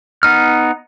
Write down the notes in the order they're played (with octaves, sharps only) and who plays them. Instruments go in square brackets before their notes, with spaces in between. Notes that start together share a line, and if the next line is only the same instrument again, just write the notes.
[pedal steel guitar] B3 D#4 F6